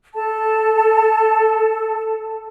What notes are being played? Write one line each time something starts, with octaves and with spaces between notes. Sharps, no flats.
A4 A5